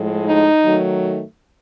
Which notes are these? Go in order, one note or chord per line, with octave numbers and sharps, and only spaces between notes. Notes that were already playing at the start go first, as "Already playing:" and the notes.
Already playing: A2 F3 G#3
D#4
D#3 F#3 A3